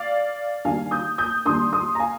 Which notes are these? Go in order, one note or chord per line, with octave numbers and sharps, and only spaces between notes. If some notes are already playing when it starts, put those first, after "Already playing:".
Already playing: D5 F5
D#2 D#3 G3 D4 F5 G#5
D#6 G6
D#6 G6
D#2 D#3 G3 D4 C6 D#6
C6 D#6
A#5
F5 G#5